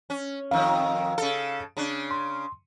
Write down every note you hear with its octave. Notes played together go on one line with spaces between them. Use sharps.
C#4
F2 D#3 F5 E6
C#3 A4
C#3 D4
C6